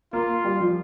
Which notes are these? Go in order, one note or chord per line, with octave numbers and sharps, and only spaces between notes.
A#3 F4
G3
F3